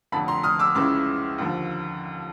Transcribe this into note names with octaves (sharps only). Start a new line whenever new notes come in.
F1 F2 D3 A5 B5
A#5 C6
D#6 F6
D6 E6
C#2 C#3 E3 C6 D6
D#2 D3 F3